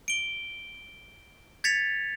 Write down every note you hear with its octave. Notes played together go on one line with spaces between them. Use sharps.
D7 G7
G#6 A6 B6 C#7 F7